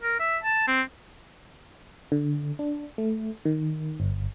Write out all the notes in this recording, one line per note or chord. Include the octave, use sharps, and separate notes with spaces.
A#4
E5
A5
C4
D3
D4
A3
D#3
G1